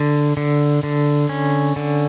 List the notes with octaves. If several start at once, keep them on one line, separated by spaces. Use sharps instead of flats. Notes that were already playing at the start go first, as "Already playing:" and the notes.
Already playing: D3
D3
D3
C#4
D3